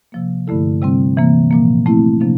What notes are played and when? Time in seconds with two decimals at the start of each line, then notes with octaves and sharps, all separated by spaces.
0.12 C3 F3 A#3
0.47 G2 D3 A3 E4 A4
0.82 C3 G3 C4
1.17 C3 E3 A#3
1.51 A#2 F3 A#3
1.85 F3 A3 C4 E4
2.21 C3 F3 A#3 D4